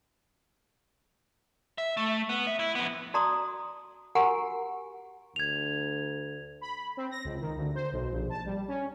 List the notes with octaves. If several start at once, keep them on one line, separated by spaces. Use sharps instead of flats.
E5
A3
B3
E5
E4
F2 B3
F#4 D5 A5 A#5 C6 D#6
F#4 G4 A#4 F#5 G#5 A#5
D2 G#6 F7
B5
C4
A#6
C#2
D#3
D2
C5
B1
A#1
A5
G3
C#4